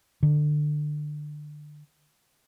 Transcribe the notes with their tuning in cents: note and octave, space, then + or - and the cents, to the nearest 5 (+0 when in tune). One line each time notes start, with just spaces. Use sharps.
D3 +25